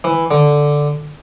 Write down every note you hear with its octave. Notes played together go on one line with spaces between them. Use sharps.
E3
D3